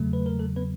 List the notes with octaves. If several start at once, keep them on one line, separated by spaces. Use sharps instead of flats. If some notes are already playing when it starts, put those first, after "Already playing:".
Already playing: E2 C#3 F#3 A3
B4
A#4
A3 A4
B3 B4